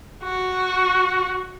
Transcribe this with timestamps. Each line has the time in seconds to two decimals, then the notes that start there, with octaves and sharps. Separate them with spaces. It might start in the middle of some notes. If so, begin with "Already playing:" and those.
0.23 F#4